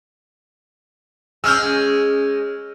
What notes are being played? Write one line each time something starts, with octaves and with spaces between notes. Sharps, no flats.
G#3 C#4 E6 F6 G6